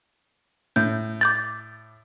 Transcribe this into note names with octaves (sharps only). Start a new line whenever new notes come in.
A2 G6
D6 G6 A6